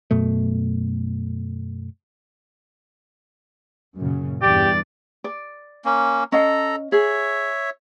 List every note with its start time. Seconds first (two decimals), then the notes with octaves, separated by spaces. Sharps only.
0.11 F#2 B2 A3
3.95 F#2 A#2 C#3
4.42 E2 G2 G4 D5
5.24 D5
5.85 A#3 C#4
6.32 C#4 A4 D#5 F5 A#5
6.92 G#4 C#5 E5